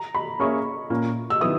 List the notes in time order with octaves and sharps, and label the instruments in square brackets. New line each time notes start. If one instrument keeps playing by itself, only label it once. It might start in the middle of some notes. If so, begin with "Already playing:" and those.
Already playing: [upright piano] A#5
B5
[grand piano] A#3 C#4 G#4 C#5 E5 [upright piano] C#6
[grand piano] A#2 A#3 C#4
[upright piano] E6
[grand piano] D#3 F#3 B3 E4 [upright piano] D#6